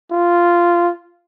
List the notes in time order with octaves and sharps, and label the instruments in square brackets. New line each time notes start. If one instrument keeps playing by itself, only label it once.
[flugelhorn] F4